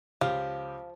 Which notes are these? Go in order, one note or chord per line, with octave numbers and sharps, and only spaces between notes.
C#2 F3 G4 F5